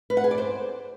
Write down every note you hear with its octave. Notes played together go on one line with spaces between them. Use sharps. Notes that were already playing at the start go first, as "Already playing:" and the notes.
B4
F#5
G#4
D5
C5